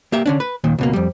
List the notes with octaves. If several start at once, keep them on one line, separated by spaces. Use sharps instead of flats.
A#3 G4 E5
D3 C#4 D4
B4
D#2 A#2 D#3
C#2 B2 A#3
F2 G3